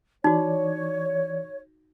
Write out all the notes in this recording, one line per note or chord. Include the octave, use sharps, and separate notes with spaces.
E3 D#4 F#4 C#5 D5